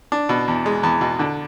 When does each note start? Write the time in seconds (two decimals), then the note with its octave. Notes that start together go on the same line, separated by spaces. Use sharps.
0.12 D4
0.29 B2
0.48 E2
0.66 G#3
0.83 E2
1.01 B2
1.19 D3